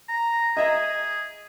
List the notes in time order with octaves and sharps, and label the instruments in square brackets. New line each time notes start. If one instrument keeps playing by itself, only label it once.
[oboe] A#5
[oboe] G#4 [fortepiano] D#5 E5 A#5